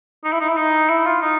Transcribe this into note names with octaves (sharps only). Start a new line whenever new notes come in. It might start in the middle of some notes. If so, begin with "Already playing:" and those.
D#4
E4
D#4
E4
D#4
E4
F4
D#4